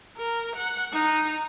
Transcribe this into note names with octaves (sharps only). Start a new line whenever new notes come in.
A#4
F#5
D#4